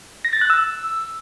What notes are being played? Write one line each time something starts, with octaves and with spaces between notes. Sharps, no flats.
A#6
A6
F#6
E6